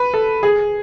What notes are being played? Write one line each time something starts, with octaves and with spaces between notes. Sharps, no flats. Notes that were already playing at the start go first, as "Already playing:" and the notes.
Already playing: B4
A4
G#4